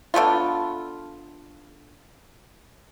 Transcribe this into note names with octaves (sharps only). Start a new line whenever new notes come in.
D3 A3 B3 F4